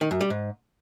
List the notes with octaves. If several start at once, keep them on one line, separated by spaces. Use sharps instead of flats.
D#3
F#2
G3
G#2